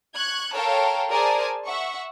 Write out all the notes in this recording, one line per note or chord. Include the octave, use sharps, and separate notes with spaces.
C#6 F#6 G#6
A4 A#4 C#5 F5 G5 A5
G#4 A#4 C5 D5 G#5 A5
E5 F#5 C#6